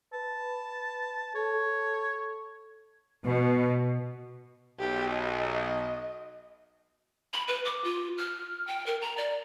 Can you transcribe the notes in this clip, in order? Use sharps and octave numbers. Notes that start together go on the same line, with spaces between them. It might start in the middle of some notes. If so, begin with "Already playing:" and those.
B4 A5
A4 C#5
B2
B1 G4
D#5
B5
B4
D6
F4
F6
G5
A#4
A#5
D5